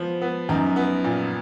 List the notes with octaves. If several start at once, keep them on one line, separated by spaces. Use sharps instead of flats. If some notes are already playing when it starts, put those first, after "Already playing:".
Already playing: F3 B3
B3
F#2 D#4
B3
A#2